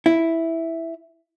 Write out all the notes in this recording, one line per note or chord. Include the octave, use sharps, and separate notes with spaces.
E4